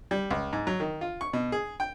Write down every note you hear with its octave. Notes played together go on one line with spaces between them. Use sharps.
G3
C#2
G#2
F#3
D#3
F4
C#6
B2
G#4
G5